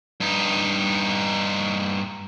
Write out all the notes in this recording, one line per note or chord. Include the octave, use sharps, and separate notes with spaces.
G2 D#4